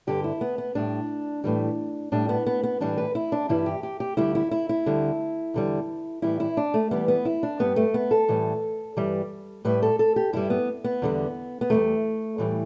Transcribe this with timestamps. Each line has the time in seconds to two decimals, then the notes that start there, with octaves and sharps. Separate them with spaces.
0.07 G2 D3 G3 G4
0.24 E4
0.41 B3
0.58 B3
0.75 A2 G3 D4
1.44 A2 E3 G3
2.12 A2 G3 D4
2.29 B3
2.46 B3
2.63 B3
2.80 A2 E3 G3 D4
2.98 B4
3.15 E4
3.32 D4
3.49 G2 E3 G3 E4
3.66 G4
3.83 G4
4.00 G4
4.17 D2 D3 G3 E4
4.35 E4
4.51 E4
4.69 E4
4.86 D2 D3 G3
5.54 E2 D3 G3
6.22 A2 E3 G3 E4
6.40 E4
6.57 D4
6.74 A3
6.91 E2 E3 G3 B3
7.08 B3
7.25 E4
7.43 D4
7.59 G2 G3 B3
7.76 A3
7.94 B3
8.11 A4
8.28 A2 E3 G3
8.97 G2 E3 G3
9.65 A2 G3 B4
9.82 A4
9.99 A4
10.16 G4
10.33 G2 G3 E4
10.50 B3
10.84 B3
11.02 E2 D3 G3
11.61 B3
11.70 E2 D3 G3 A3
12.38 A2 E3 G3